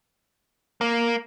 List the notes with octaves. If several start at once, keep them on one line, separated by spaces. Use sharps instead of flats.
A#3